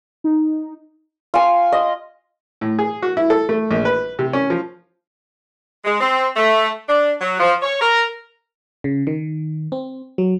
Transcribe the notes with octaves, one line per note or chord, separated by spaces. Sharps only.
D#4
F4 G#5
D#5
A2
G#4
F#4
E4
A4
A3
A#1
B4
C3
C#4
F3
G#3
C4
A3
D4
F#3
F3
C#5
A#4
C#3
D#3
C4
F#3